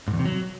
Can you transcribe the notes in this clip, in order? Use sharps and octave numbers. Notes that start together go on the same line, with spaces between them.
G#2
E2
C3
F#3